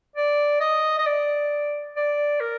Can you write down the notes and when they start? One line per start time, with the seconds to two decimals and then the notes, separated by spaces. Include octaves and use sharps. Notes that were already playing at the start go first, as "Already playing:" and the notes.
0.16 D5
0.60 D#5
0.99 D#5
1.06 D5
1.96 D5
2.41 A#4